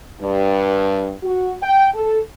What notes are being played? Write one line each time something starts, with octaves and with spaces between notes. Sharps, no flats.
G2
F#4
G5
A4